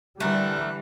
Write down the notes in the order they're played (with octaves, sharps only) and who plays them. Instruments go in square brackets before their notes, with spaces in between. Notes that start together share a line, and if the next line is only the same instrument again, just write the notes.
[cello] D3 E3 [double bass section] G3 [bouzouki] A3 A#4 [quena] F#6